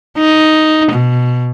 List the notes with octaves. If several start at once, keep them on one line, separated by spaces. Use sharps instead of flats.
D#4
B2